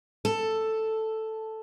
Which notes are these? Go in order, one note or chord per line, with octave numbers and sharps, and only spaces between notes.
A4